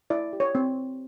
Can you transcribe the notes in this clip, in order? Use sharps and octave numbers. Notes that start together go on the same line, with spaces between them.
E4 D5
G4
C#5
C4